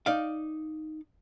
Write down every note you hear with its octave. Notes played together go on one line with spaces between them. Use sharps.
D#4 D5 F5